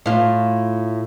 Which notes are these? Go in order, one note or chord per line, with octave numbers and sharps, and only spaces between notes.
A2 F4